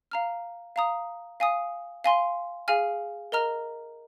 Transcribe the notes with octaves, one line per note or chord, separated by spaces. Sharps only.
F5 A#5 F6
F5 A#5 D#6
F5 G#5 D#6
F5 G#5 C6
G#4 F5 G#5 F6
A#4 D#5 A#5 F6